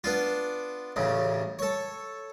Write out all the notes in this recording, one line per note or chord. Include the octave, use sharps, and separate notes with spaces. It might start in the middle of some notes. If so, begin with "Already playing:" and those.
B3 D4 F4
A1 D2 C#3
A4 C#5